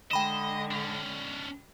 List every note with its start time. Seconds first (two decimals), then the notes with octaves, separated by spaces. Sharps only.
0.11 D3 G#3 D#5 G5 B5 E7
0.71 C#4 D4